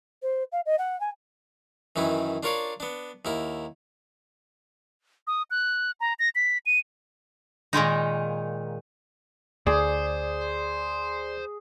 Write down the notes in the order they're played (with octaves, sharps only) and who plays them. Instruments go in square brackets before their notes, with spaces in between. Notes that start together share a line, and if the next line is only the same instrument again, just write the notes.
[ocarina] C5
F5
D#5
F#5
G#5
[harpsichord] F#2 D#3 E3 E4
D4 F4 A#4 C#5 D5 F5
B3 D4
D#2 E4 A#4
[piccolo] D#6
F#6
A#5
A#6
B6
D#7
[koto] A#2 D#3 G#3 D#4
[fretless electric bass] D2 [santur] G#4 [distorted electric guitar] C5 [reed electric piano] D5